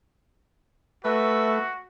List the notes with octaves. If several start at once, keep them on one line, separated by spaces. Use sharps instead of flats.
A3 F#4 B4 E5